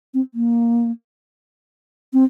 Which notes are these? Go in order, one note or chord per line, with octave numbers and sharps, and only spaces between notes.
C4
A#3
C4